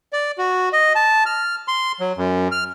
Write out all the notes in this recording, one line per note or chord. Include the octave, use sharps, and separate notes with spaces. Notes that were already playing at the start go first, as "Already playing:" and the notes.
D5
F#4
D#5
A5
F6
C6
F#3
F#2
F6